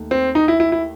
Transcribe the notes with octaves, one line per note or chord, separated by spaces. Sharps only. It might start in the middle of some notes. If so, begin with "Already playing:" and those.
Already playing: D#2 D#3 A3
C4
D#4
E4
E4
E4